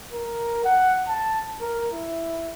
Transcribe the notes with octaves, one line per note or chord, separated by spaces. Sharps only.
A#4
F#5
A5
A#4
E4